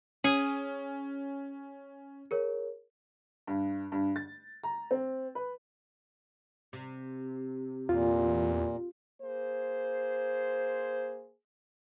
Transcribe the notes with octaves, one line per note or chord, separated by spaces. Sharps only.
C#4 G#4
G#4 A#4 C#5
G2
G2
A6
A#5
C4
B4
C3
E2 A#2 F4
A#3 G#4 C5